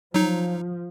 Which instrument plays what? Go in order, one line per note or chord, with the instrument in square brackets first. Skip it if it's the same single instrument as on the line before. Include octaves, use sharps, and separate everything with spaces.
[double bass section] F3 [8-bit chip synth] F#3 D#4